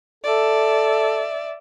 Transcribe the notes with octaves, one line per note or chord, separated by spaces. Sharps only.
A4 D5 E5